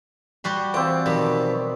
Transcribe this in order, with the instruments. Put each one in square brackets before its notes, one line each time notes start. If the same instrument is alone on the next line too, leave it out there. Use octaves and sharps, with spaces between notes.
[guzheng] G3 F#4 C6
[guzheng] E3 [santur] C4 D5 [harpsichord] F4
[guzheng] B2 [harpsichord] D#3 F3 G3